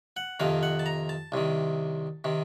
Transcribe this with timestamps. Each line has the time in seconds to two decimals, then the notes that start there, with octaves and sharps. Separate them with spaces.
0.17 F#5
0.40 F2 C3 D#3 F5
0.63 F#5
0.79 A5
0.86 A#5
1.09 A5
1.32 C2 C3 D#3
2.24 C3 D#3